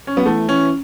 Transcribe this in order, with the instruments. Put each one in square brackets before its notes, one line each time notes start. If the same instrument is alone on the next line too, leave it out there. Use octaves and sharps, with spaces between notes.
[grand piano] C#4
[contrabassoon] F#3 [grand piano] B3
[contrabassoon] E3 [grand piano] A3
[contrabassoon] E3 [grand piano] C#4